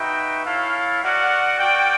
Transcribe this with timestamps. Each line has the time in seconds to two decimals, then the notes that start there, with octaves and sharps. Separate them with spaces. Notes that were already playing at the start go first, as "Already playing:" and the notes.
Already playing: D#4 F#4 B4 E5 G5
0.44 E4 A4 C#5 F5
1.02 F#4 A#4 D5 F#5
1.58 F#4 A#4 D5 G5